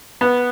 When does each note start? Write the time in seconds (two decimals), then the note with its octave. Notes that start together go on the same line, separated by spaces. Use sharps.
0.21 B3